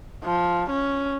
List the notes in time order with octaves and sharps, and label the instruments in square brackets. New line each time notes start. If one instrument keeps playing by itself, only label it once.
[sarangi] F3
C#4